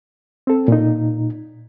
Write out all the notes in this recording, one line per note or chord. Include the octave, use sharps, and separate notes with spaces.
C4 A4
A#2 D#4